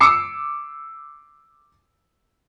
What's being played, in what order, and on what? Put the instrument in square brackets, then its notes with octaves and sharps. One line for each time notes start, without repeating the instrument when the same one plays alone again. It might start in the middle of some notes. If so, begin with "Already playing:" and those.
[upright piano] D6 E6 C7 C#7